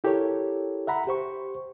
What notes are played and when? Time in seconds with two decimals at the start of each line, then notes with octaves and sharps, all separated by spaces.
0.04 E4 G4 A4 A#4 C#5
0.87 E5 F#5 A#5 B5
1.07 G4 C5 C#6